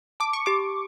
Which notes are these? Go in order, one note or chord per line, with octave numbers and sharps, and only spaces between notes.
A5 D6
C#6
G4 D6